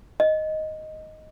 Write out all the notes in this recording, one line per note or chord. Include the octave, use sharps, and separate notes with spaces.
D#5